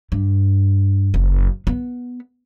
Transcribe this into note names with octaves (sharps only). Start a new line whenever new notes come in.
G2
F#1
B3